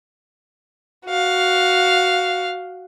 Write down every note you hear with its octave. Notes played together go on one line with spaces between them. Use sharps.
F#4 F5